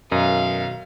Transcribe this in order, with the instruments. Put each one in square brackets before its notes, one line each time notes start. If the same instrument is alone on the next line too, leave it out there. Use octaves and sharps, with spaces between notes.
[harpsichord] B1 D#3 D#6 [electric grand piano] F#2 [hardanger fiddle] F5